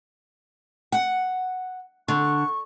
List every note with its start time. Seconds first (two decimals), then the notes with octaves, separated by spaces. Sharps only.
0.92 F#5
2.08 D3 C#6